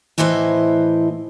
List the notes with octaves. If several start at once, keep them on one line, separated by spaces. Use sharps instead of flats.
A2 E3 E4 B4 C5 D#5